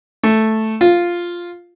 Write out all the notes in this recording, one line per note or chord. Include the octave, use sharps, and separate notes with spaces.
A3
F4